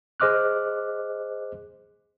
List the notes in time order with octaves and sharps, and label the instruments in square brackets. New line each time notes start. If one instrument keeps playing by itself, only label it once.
[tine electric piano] G#4 C5 D#5 D6 F6 F#6